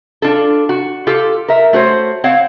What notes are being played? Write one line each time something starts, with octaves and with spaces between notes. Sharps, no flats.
D4 F4 A4
F#4
F4 G4 A4
A#4 E5
A3 F#4 C5 C#5
C4 C#5 F5 F#5